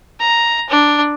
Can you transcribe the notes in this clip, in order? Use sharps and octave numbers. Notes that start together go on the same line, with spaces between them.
A#5
D4